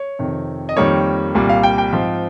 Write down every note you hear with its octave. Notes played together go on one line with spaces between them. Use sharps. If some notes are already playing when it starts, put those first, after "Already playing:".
Already playing: C#5
F2 C3 D#3
D#5
F2 D#3 G3 A#3 C#5
C2 A#2 G3
F5
G5
G5
G#2 F3 C4